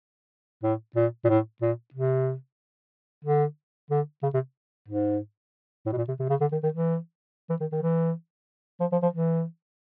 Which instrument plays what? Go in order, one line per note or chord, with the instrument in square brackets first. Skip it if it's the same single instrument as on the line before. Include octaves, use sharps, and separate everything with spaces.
[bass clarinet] A2
A#2
A#2
A2
A#2
C3
D3
D3
C#3
C3
G#2
A2
B2
A#2
C3
C3
C#3
D3
D#3
D#3
E3
E3
D#3
D#3
E3
F3
F3
F3
E3